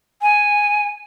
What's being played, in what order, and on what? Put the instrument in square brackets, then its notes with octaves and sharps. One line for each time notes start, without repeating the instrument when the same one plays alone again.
[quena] G#5